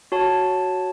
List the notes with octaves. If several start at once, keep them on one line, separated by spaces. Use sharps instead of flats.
F#4 C#5 A5